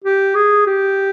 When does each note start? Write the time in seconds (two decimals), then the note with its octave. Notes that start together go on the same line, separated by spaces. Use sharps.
0.04 G4
0.35 G#4
0.67 G4